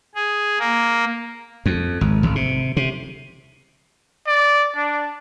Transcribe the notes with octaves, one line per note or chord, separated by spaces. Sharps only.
G#4
A#3
F2
G#1
G#1
C3
C3
D5
D4